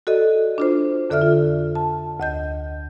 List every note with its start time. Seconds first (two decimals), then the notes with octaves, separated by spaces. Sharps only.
0.07 F#4 A4 D5 D#5
0.58 D4 F4 C5
1.10 F2 D3 A4 D5 E5 F6
1.22 F4
1.75 A5
2.20 D2 D#5 G6